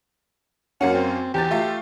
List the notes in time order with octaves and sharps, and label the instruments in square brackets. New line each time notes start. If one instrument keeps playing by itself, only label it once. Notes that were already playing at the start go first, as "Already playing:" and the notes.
[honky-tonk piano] F#2 A#3 C#4 [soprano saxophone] F#5
[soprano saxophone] C4
[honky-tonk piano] E2 A6 [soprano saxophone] G4
[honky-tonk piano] A3 F4